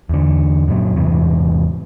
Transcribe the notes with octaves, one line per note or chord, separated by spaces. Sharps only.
E2 D3
F#2 A#2 F#3
E2 G#2 C3 E3